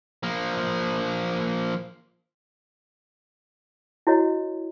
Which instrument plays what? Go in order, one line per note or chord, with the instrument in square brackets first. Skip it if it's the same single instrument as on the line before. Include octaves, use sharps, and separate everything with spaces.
[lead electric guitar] F3 A#3
[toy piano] E4 F#4 C#5 D#5